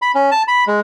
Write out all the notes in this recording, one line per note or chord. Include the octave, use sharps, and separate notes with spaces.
B5
C#4
A5
B5
G#3